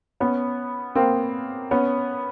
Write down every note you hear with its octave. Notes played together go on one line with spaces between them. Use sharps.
B3 C#4
A#3 C4
B3 C#4